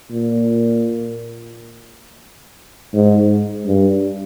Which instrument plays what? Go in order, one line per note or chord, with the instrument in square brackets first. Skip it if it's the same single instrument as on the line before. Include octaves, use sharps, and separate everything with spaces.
[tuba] A#2
G#2
G2